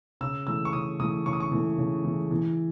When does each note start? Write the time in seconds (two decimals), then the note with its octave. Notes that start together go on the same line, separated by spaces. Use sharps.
0.21 C#3 E6
0.47 E3 A3 E6
0.65 C#6
0.73 C#3 D#6
1.00 E3 A3 D#6
1.26 C#3 C#6
1.33 D#6
1.40 C#6
1.52 E3 A3
1.78 C#3
2.05 E3 A3
2.31 E3